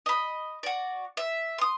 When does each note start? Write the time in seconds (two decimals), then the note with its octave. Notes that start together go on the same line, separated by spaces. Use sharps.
0.06 D#5 B5
0.63 F#4 D5
1.17 E5
1.58 C6 D#6